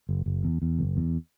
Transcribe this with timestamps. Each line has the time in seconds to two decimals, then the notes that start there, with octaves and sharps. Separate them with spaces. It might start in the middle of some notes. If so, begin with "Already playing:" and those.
0.09 F#1
0.26 F#1
0.44 E2
0.62 E2
0.78 F#1
0.97 E2